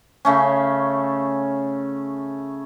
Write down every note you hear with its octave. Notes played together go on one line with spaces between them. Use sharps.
C#3 A3 C#4